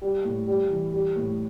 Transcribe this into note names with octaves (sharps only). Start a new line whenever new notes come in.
G3
A2
G3
E3
G3
A2